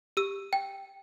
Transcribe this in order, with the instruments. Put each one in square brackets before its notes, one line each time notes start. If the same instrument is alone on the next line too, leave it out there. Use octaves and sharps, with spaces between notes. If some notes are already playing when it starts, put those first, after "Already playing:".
[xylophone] G4 E6
G5